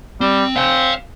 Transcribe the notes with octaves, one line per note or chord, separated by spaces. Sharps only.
G3 C4
C4 F5 G#5